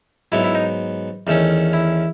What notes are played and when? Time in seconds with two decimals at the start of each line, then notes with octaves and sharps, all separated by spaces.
0.32 G#2 F#3 B3 E4
0.44 E4
0.55 D#4
1.27 E2 D#3 A3 C#4
1.73 E4